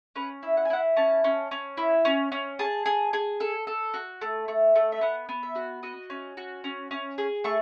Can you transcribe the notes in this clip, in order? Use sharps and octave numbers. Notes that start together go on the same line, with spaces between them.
C#4 B4
E4
F#5
G#5
E4 F#5
C#4 A5
C#4
C#4
E4
C#4
C#4
G#4 A5
G#4
G#4
A4
A4
F#4
A3
A3
A3
E5
B3 F#5
B3
E5
F#4
F#4 D#5
C#4
F#4
C#4
C#4
G#4
A3 C#6